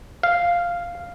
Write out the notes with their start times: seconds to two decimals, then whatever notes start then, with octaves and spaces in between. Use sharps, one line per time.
0.23 F5